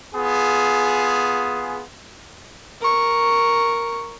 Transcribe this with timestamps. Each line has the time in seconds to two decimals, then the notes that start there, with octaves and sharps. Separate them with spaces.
0.15 B3 F4 G#4
2.81 A#4 C#6